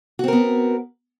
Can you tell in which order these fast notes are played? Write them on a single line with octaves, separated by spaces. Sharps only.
F#4 C4 A#4 B3